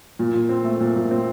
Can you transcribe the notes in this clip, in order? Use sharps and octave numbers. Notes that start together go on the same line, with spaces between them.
A#2
A#2
C4
A3
A#2
A#2
C4